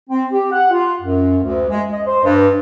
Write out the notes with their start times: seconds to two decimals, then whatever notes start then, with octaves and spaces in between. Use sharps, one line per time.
0.10 C4
0.30 G4
0.51 F#5
0.71 F4
1.01 F#2
1.42 D2
1.70 G#3
1.91 D#5
2.06 C5
2.24 G2